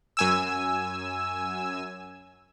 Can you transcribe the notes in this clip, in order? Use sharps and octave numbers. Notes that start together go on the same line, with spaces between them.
F#2 G#5 E6